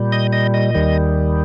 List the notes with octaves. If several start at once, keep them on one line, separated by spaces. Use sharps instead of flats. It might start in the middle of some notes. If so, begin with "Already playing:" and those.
Already playing: A#2 G3
D#5
D#5
D#5
D#2 D#3 G3